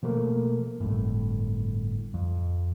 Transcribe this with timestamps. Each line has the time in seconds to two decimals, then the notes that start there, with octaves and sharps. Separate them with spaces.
0.03 B2 F3 A3 A#3
0.81 G1 A2
2.14 F2